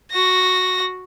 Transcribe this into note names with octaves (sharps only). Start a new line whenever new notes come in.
F#4 A#6